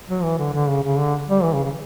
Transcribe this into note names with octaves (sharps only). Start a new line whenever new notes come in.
F#3
E3
D3
D3
C#3
C#3
D3
G3
E3
C#3
C#3